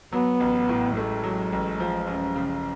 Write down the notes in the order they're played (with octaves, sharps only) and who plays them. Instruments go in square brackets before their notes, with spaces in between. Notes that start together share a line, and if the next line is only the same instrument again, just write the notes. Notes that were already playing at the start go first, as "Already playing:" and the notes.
[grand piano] F#3 [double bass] B3
[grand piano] A1
A2
[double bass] G#3 [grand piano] A3
[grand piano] F#3
A1
F3
F#2
C#3